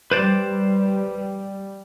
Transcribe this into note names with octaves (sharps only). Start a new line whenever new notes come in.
G3 B4 C5 D5